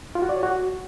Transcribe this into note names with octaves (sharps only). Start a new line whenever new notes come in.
F4
F#4
D5
C#5
F#4